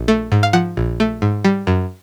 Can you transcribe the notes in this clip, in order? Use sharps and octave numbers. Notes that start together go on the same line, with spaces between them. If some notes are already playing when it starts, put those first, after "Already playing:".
Already playing: A#1
A3
G#2
F5
F3 F#5
A#1
A3
G#2
G3
F#2